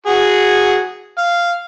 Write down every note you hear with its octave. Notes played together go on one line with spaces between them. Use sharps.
F#4 G#4
F5